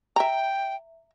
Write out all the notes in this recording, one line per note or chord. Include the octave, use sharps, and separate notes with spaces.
E5 G5 A#5